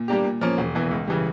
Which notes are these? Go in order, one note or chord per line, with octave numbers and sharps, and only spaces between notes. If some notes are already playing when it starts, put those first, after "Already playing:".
Already playing: A#2
G3 A#3 D4 G4
A#2
F3 A#3 C#4
E1
E2 E3
C#2
C#3 E3 G3